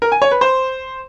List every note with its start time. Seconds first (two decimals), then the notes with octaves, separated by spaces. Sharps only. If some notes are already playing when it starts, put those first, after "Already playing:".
0.02 A#4
0.12 G#5
0.22 C#5
0.31 B4
0.41 C5